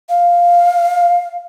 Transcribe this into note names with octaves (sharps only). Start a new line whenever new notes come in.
F5